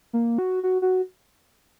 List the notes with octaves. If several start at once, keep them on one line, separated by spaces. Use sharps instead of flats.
A#3
F#4
F#4
F#4